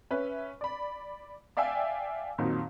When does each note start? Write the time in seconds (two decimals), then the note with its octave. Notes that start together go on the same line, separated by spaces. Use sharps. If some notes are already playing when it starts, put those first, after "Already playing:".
0.11 C#4 B4 E5
0.61 D5 B5
1.57 D5 E5 F5 G5 G#5 E6
2.38 F2 A#2 D#3 F#3